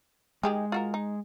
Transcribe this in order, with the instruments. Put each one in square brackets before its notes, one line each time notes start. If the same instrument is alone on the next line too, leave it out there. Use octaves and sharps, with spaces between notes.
[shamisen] D#3 G4 G#4 [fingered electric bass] G#3
[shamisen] F4 F#4 A#4
D#4